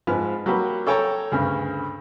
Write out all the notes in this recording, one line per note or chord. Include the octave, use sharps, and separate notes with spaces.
G#2 F3 B4 F6
F#3 G3 A#3 G4 B4
A4 C#5 G5 A5 A#5
D2 G2 C#3